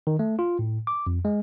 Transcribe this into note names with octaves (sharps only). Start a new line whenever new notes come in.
D#3
A3
F4
A2
D6
F2
G#3